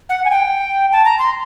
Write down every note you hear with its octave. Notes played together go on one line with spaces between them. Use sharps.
F#5
G#5
G5
A5
A#5
C6